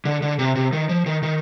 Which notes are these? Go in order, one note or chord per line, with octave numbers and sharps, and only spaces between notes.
D3
D3
C3
C3
D#3
F3
D#3
D#3